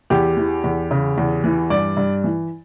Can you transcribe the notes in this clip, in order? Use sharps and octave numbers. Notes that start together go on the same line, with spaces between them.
E2 G4
E3
E2
C#3
E2
E3
G2 D5
G2
E3